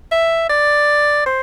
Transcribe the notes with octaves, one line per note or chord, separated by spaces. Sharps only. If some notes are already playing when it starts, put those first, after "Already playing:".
E5
D5
C5